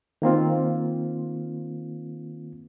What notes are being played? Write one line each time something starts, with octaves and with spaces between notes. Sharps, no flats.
D#3 A#3 C4 F4